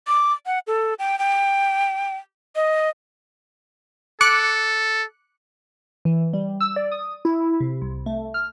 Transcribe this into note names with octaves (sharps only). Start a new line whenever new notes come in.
D6
F#5
A4
G5
G5
D#5
A4 D6 F#6 C#7
E3
G3
E6
D5
D#6
E4
C3
C2
A3
F6